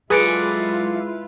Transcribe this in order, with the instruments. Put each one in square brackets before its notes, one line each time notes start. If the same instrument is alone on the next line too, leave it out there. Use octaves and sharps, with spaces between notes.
[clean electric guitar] F#3 A4 D5 [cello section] G#3 E4 F4 [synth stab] G#4 [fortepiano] B4